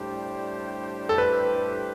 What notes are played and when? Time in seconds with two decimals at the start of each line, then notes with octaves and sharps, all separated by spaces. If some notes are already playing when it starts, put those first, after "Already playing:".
Already playing: A2 G3 D4 G4 C5
1.09 A4
1.18 B4